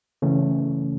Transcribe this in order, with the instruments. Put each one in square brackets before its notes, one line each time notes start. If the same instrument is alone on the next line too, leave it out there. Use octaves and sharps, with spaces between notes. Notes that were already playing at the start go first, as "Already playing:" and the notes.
[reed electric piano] C#3 E3 A3 C#4